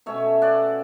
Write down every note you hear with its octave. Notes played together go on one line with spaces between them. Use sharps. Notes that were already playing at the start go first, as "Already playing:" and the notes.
B2 A3 C#4 C#5 E5
D5 F#5